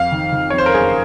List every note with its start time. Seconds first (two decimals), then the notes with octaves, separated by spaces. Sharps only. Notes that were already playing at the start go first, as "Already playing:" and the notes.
Already playing: F2 F5
0.12 D#3
0.32 D#3
0.50 C#5
0.53 F2
0.58 C5
0.66 A#4
0.74 F#1 G#4